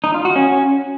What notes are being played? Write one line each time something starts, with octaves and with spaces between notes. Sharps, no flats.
D#4
F4
F#4
C#4